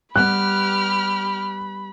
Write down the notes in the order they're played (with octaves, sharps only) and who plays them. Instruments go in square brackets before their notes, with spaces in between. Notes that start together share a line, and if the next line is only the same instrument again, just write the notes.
[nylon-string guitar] G3 B3 [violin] G4 F6 [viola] B5 [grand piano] F#6